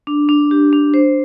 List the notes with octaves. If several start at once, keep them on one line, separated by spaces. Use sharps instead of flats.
D4
D4
G4
D4
C5